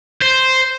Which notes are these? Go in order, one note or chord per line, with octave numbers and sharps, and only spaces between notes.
C5